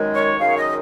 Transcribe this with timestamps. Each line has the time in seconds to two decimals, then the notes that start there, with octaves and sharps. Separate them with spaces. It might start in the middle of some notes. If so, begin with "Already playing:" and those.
Already playing: F#2 D#3 G#3
0.14 C#5
0.39 F#2 D#3 G#3 F5
0.48 C#5
0.57 D#5